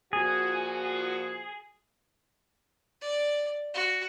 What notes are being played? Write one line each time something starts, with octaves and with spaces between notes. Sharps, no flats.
A#2 F3 F#4 G#4
D5
F#4